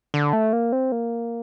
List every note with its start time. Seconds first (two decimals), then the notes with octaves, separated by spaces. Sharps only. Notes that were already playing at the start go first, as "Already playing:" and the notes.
0.14 D3
0.33 A3
0.53 A#3
0.72 C4
0.92 A#3